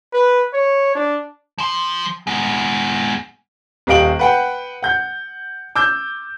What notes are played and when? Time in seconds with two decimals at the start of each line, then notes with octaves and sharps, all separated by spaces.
0.13 B4
0.53 C#5
0.95 D4
1.58 F3 C6
2.27 G#3 B3
3.87 D#1 G4 D#5 F5 D7 F#7
4.19 B4 F#5 G5
4.83 F#5 G6
5.76 D6 E6 G6